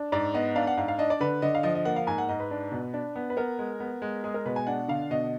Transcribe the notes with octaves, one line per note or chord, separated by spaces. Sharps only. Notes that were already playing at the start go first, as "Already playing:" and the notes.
Already playing: D4
G#2 D5
B3 D#5
D4 F5
F#5
G#2 F5
F5
D4 D#5
D5
D3 B4
D3 D#5
F5
F3 D#5
D#5
A#3 F#5
F5
G#2 G#5
F#5
G#2 D#5
B4
D4
B2
D4
B3
B4
B3 A#4
G#3
B3
G#3
G#3 G#4
A#4
B2 B4
G#5
D4 F#5
D3 F5
B2 D#5